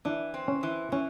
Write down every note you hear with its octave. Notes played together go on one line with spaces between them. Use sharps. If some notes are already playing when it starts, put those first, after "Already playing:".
E3 D4
C4
C#4
E3
E3 C#4